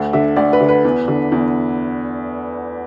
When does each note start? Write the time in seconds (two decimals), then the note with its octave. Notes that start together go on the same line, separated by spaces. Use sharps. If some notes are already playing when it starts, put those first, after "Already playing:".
Already playing: D2
0.13 D3 E5
0.37 D2 D5
0.53 B4
0.61 D3
0.69 B4
0.85 E2
1.08 D3
1.32 E2